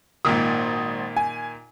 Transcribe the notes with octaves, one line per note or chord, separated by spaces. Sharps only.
G#1 A#2 D#3 D#6
G#5